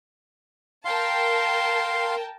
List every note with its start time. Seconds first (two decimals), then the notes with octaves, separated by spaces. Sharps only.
0.85 A#4 F5 G5 A5 C6